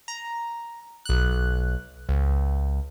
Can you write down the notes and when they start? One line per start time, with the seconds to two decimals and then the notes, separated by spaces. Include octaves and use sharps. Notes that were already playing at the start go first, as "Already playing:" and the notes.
0.08 A#5
1.05 B1 F#6
2.09 C#2